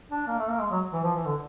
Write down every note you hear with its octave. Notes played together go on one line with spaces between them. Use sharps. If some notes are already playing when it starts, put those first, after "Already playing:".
D4
A#3
A3
A#3
G#3
F#3
E3
F3
E3
D3